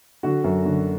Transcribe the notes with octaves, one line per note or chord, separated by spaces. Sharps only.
D3 F#4
F#2
D3